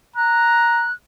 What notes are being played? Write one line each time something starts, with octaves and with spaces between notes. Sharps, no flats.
A#5 F#6